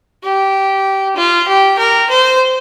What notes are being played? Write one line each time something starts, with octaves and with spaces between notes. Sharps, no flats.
G4
F4
G4
A#4
C5